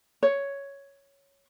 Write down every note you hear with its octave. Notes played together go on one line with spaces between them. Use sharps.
C#5